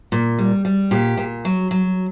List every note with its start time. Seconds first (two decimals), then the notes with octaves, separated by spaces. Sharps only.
0.12 A#2
0.39 G3
0.65 G3
0.91 A#2 G4
1.17 A#2
1.45 F#3
1.71 F#3